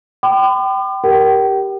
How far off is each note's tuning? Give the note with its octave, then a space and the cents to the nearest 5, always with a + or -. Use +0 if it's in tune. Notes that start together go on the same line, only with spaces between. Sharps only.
G5 -20 B5 +40 D6 +45
G4 +0 A#4 +0 G5 -35